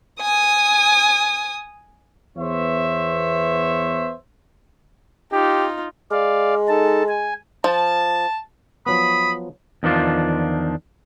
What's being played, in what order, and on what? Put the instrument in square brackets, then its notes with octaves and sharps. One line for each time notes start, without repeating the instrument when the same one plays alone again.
[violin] G#5 D#6
[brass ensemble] E2 B3 C5 C#5 E5
[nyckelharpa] D#4 F4 [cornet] G4
[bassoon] G#3 [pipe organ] D5 F5
[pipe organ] D#4 A4 A5
G#5
[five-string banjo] F3 [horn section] A5
[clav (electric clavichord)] F3 F#3 B3 [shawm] B5 [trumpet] D#6
[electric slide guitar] E2 D#3 F3 D4 F4